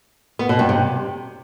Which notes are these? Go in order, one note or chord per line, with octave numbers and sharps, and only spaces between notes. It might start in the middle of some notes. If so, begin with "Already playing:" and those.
B3
B2
G2
C3